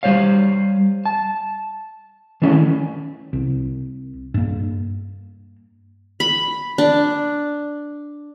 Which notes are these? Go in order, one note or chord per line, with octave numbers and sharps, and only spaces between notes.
G3 A#3 C5 C#5 F5
A5
D#3 E3 A3 C#4
C2
G2 A#3
B5
D4